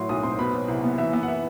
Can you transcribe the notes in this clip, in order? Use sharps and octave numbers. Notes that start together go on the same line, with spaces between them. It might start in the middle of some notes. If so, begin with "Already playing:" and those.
Already playing: A2 F#3 C6
B1 D#6
C4 C6
B2 B5
F#3
C2
B3
E3 E5
B3 E5
F#5
E5